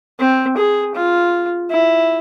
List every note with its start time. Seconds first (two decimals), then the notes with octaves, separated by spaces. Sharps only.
0.20 C4
0.57 G#4
0.95 F4
1.70 E4